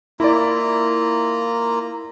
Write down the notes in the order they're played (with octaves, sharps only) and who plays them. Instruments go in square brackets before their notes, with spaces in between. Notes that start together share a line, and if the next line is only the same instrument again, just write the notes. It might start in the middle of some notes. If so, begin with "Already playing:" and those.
[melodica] A#3 F4 A#5 [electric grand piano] E4 D5